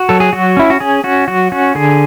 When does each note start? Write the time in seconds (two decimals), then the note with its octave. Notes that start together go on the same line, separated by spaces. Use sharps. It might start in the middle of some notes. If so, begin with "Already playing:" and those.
Already playing: F#4
0.09 F#3 A4
0.20 G#4
0.33 F#3 F#4
0.57 C#4 E4
0.70 F#4
0.80 C#4 G#4
1.04 C#4 F#4
1.28 F#3 F#4
1.52 C#4 F#4
1.75 D3 G#4